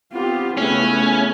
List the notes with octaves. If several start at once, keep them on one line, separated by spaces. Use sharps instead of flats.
B3 C4 F4 G4
C#3 A3 B3 C#4 E4